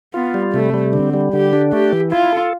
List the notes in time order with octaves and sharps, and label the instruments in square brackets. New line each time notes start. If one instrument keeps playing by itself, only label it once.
[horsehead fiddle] B3 [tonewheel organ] F4
[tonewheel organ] G3
[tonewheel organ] C3 [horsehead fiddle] A3
[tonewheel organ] G3
[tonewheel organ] D3 [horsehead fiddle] C4
[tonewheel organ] G3
[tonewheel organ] D3 [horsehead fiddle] G4
[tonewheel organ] D4
[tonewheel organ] A3 [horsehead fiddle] G4
[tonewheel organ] E3
[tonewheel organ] E4 [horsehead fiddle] F4
[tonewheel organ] A4